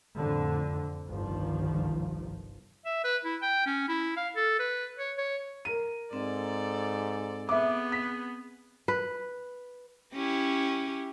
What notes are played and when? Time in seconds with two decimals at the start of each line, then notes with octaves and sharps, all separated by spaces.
0.17 F2 A2 D3
1.08 G1 C2 D#3 F3
2.85 E5
3.04 B4
3.25 E4
3.42 G5
3.66 C#4
3.88 E4
4.17 F5
4.36 A4
4.59 B4
4.98 C#5
5.18 C#5
5.65 A#4 D#7
6.13 G#2 C4 A4 D5
7.49 B3 G#4 E5 D6
7.92 B6
8.88 B4
10.13 C#4 E4 G4